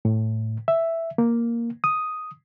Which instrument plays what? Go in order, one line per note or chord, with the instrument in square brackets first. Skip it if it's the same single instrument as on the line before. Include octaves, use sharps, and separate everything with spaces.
[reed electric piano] A2
E5
A#3
D#6